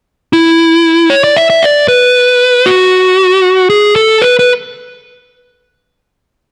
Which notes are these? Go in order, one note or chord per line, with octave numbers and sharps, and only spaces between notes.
E4
C#5
D5
E5
E5
D5
B4
F#4
G#4
A4
B4
B4